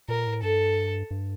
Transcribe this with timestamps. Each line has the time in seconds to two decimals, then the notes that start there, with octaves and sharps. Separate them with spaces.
0.09 A#2 A#4
0.27 A2
0.43 G2 A4
1.11 G2